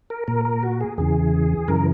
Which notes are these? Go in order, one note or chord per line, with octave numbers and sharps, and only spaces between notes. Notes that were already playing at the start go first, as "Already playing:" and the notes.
A#4
A#2 A#4
A#4
F#4
G#4
E2 C#3 E3 G#4
F#2 C#3 E3 A#4